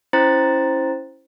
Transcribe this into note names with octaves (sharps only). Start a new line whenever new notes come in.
C#4 E4 C5 A#5 A6